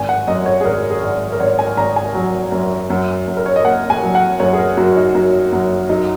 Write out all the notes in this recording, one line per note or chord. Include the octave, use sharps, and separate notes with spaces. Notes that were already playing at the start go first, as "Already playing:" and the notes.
Already playing: G#1 G#5
F#5
F#2 D#5
C#5
G#4
G#1 A#4
G#4
G#1
A#4
G#1 C#5
G#5
G#1 A#5
G#5
F#3
F#2
F#2
F#2
A#4
C#5
D#5
A#3 F#5
G#5
F#3
F#5
F#2 C#5
G#4
A#4
F#2 F#4
D#4
F#2 F#4
F#2
F#3 D#4